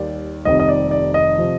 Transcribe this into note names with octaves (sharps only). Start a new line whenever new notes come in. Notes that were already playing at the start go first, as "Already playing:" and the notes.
Already playing: D#2 D#3 G3 D5
F1 F2 D#3 G3 D#5
D#5
D5
D5
D#5
C3 F3